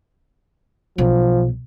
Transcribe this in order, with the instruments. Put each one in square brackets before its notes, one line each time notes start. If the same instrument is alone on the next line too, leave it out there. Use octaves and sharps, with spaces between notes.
[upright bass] B1 [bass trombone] F3